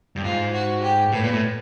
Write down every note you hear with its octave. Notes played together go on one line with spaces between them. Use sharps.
G2
G#2 F4
F#4
G4
A2 B4
A#2
A2